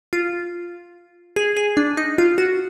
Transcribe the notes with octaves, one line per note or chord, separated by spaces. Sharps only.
F4
G#4
G#4
D4
D#4
F4
F#4